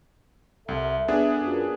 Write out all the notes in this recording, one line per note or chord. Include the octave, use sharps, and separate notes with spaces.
C2 A4 E5
B3 D4 G#4
F#2 A#2